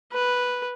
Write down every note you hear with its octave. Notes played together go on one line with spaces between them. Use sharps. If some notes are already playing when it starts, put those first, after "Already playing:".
B4